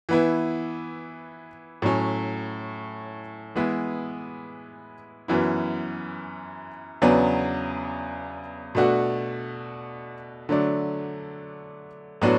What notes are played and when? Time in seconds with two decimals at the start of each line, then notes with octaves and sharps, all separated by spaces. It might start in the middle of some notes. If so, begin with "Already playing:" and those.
0.09 E3 B3 E4
1.82 A2 F#3 C#4
3.55 E3 G#3 B3 E4
5.28 F#2 E3 B3 E4
7.02 E2 C#3 F#3 B3 D4
8.75 B2 A3 D4 F#4
10.49 D3 F#3 A3 D4
12.22 A2 F#3 B3 D4 F#4